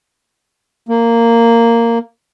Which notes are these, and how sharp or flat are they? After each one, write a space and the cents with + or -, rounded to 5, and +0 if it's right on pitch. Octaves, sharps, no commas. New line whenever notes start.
A#3 -10